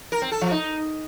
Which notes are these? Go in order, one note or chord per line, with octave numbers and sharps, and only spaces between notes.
A#4
C4
A4
F3
D#4